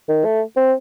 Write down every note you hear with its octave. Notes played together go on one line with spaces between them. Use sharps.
D#3
A3
C4